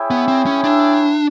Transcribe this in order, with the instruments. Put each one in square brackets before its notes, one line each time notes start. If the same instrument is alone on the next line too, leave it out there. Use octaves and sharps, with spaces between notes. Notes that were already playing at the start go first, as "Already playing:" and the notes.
Already playing: [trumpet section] E4 G#4 C#5 E5 G5
[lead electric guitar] B3
C4
C#4
D4